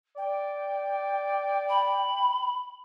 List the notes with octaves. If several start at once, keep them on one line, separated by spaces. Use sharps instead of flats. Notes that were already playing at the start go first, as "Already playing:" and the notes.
D5 G5
B5